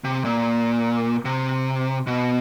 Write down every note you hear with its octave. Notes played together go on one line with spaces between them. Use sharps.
C3
A#2
C3
B2